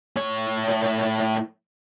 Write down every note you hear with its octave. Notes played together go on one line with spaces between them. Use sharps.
A2 C#5